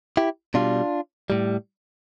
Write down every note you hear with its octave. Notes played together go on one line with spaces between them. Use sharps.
E4 G4
B2 G3 D4 F4
A2 G3